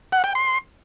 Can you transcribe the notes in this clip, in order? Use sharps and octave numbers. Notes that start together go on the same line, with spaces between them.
F#5
G5
C6